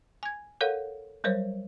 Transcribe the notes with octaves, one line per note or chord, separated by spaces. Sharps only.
G#5 G#6
A4 A#4 C#5 F5 F#5
F#3 G3 A#4 C5 C#5